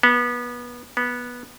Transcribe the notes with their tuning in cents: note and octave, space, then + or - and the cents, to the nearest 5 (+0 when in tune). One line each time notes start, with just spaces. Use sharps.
B3 -25
B3 -15